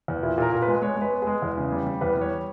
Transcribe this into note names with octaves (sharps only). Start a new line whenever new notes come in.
E2
A#2 E4
A#2 A#4
A#2
B4
G#3
G#3 C#5
G#3
B4
B3
G#3 G#4
E2
C#3
G3
G3
E2 B4
G3
C#5